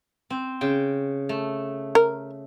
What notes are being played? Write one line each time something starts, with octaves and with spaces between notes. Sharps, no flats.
C4
C#3 G5
A3
A#4